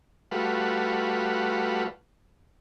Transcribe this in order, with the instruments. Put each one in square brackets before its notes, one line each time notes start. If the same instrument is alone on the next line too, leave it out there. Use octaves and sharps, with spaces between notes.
[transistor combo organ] G3 A3 F4 F#4 B4